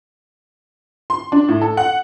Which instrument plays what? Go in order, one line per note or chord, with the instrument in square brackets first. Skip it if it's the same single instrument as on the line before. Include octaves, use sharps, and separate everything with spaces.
[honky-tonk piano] C6
D4
A2
A4
F#5